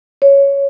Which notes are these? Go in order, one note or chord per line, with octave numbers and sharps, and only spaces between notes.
C#5